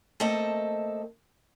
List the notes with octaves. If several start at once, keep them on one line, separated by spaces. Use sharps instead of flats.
A3 A#3 C4 A4 D#5 E5